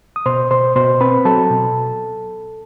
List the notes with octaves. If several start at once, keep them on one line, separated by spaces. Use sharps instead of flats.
D#6
B2 C5 C6
B2 C5 C6
B2 C5 C6
C4 B4 B5
F#3 A4 A5
B2